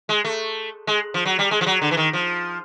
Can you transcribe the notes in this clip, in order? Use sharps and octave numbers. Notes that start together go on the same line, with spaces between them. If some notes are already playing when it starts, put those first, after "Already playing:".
G#3
A3
G#3
F3
F#3
G3
G#3
F3
F#3
D3
E3
D#3
F3